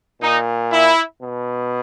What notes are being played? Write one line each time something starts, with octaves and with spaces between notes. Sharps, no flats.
A#2 D#4
E4
B2